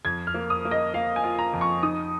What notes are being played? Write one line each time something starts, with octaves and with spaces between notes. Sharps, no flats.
F2 G#6
F6
A#3
D#6
A#3
D#5
A#3 F5
G#5
F4
A#5
F2
C#6
D#4 D#6